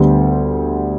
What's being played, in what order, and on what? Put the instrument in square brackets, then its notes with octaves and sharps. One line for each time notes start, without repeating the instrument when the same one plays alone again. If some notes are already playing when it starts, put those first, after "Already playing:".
Already playing: [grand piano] D2 D3 G3 B3